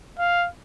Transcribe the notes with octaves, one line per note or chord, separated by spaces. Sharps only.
F5